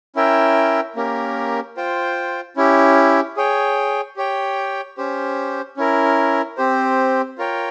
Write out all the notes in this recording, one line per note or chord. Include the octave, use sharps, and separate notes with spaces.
C#4 E4 A#4 E5 G5
A#3 C#4 G4 A#4
F4 C5 G5
C#4 E4 G4
G#4 C#5 G5
G4 C#5 G5
C#4 G4 C5
C#4 E4 A#4
C4 G4 C5
F4 A#4 C#5 G5